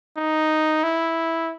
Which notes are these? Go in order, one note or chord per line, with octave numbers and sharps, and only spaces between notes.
D#4
E4